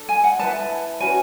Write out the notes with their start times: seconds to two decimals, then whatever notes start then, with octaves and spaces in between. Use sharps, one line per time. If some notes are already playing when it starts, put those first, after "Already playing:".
Already playing: D4 A4
0.09 G#5
0.24 F#5
0.39 E4 B4 A5
1.00 C#4 F#4 B4 G#5